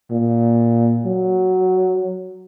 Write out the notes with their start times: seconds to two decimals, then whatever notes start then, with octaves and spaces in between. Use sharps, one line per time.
0.11 A#2
1.06 F#3